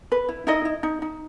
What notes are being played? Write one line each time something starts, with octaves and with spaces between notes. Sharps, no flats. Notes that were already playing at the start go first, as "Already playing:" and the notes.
B4
E4
D#4 E4 D#5
E4
D#4
D#4